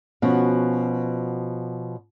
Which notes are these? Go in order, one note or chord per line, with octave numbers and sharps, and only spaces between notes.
B2 F3 B3 C#4 F#4